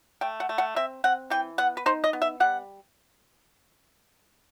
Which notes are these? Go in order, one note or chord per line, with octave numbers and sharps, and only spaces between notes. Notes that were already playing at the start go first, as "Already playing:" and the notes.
A3 G5
F#5
A3
F#5
C4 E5
C4 F#5
E3 G5
B3 F#5
B4
D#4 C5
D#5
B3
E5
G3 F#5